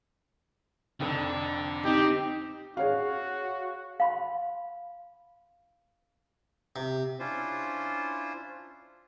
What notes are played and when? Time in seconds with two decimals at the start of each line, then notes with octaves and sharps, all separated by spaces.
1.00 F1 F2 D3 D4 A4
1.85 C4 D#4 G4
2.77 F#4 G#4 C#5 F5
4.00 F5 B5 C6
6.76 C3
7.19 C#4 D4 E4 F4 C5